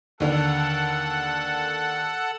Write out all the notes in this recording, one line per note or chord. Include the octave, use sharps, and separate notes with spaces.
D#2 D3 A4 F#5